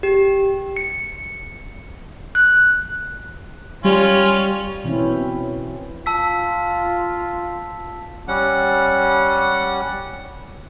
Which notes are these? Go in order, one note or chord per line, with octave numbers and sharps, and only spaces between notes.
G4
C#7
F#6
G3 C#4 F4
B2 E3 C4 C#4 E4
F4 A5 E6 B6
G3 C#4 F#5